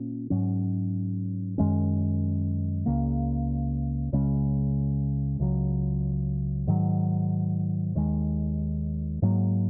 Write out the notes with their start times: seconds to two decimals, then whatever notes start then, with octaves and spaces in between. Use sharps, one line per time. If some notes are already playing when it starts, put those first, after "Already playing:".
Already playing: A#2 A#3 C#4
0.30 G#2 F#3 C#4
1.58 F#2 D#3 G#3 C#4
2.86 C#2 C#3 A#3
4.12 C#2 C#3 G#3 C#4
5.39 C#2 C#3 F#3
6.67 G#2 D#3 F#3
7.95 D#2 D#3 G#3
9.22 G#2 F#3 A#3